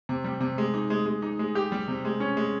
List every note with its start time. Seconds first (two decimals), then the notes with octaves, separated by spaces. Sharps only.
0.09 C3
0.24 G3
0.40 C3
0.58 G#3
0.74 D#4
0.90 G#3
1.06 G#3
1.22 D#4
1.39 G#3
1.55 G4
1.72 G3
1.88 C3
2.05 G#3
2.20 C#4
2.37 G#3